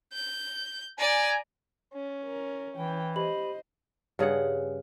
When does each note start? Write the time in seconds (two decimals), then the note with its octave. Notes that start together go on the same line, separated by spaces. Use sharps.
0.13 G6
0.99 D5 G#5 A#5
1.93 C#4
2.25 A#4
2.76 E3 G5
3.16 G4 C5 D#5 B5 F#7
4.19 G2 C#3 G#4 F#5